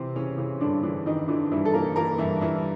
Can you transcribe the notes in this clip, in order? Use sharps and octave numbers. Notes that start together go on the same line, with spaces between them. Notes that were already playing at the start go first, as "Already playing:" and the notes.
Already playing: C3 E3 C4
C#3 E3 C#4
C#3 E3 C#4
G2 D3 D4
D3 E3 D4
D#3 E3 D#4
D3 E3 D4
G2 E3 E4
A4
E3 A#3 A#4
E3 A#3 A#4
G2 E3 E4
G2 E3 E4